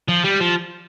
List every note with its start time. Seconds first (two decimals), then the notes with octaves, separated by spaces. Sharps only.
0.09 F3
0.24 G3
0.40 F3